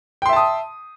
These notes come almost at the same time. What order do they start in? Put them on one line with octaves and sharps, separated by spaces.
G5 C6 E5 A5 D#6